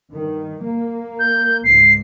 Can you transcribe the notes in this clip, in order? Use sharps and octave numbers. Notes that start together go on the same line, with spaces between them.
G2 D#3
A#3
G6
C#2 G#2 C7